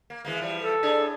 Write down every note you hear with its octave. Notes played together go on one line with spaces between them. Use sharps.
A#3
E3 G#3 A#3
E3 F3 G3
A4
A2 D4 G#4